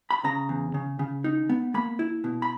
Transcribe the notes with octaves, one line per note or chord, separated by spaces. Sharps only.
B5
C#3 A#5
E2
C#3
C#3
D#4
B3
A#3 B5
E4
B2
B5